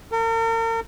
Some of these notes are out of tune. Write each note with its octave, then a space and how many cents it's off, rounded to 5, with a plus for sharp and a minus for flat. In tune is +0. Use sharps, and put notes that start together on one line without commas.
A#4 -40